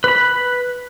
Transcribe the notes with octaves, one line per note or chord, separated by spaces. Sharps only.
B4 B5